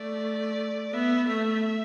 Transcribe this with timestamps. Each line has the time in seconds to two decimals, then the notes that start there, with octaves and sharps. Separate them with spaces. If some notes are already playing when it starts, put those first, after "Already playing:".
Already playing: A3 D5
0.93 B3 E5
1.28 A3 E5